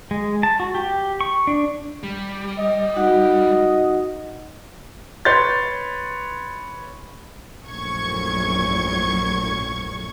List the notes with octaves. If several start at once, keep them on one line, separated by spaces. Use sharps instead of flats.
G#3
A5
F#4
G4
C#6
D4
G3
D#5
D#4 F#4 F#5
B4 C#5 C6 G6 A6
A#1 F#2 A2 C#6 G#6